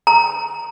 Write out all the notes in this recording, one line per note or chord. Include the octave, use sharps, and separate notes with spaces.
A#5